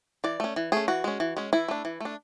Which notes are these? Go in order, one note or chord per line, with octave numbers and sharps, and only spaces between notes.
E3 D5
A3 C#4
E3
A3 C#4 G#4
E3 F#4
G#3 C#4
E3
G#3 C#4
E3 E4
A3 D4
E3
A3 D4